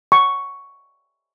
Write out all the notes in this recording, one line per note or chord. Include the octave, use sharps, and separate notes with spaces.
C#6